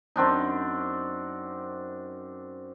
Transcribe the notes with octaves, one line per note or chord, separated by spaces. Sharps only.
F#2 C4 D4 D#4